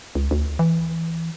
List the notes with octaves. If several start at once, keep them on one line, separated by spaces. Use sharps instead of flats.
C#2
D2
E3